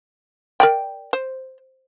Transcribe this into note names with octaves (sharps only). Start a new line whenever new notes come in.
A#4 D5 G5
C5